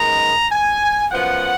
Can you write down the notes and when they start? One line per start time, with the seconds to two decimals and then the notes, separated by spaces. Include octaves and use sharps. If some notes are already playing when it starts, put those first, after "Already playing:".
Already playing: F#2 D#3 G#3 B3 A#5
0.52 G#5
1.12 F#2 F3 B3 F#5